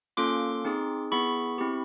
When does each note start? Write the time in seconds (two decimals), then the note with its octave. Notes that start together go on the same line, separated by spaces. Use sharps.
0.17 A#3 C#4 F4 A4 C6 D6
0.65 C4 D#4 G#4
1.12 B3 E4 G#4 B5 C#6
1.58 C4 E4 G4